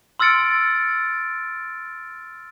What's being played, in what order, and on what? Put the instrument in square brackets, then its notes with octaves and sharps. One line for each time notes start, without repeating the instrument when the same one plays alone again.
[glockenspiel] C6 E6 F6 A6 C#7 D7